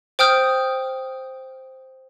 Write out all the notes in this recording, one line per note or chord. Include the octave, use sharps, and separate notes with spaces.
C5 G5 D#6 F6 G6